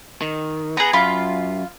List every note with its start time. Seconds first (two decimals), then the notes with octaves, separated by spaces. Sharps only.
0.22 D#3
0.77 B3 G#4 B4 A#5
0.93 F#2 F4 B5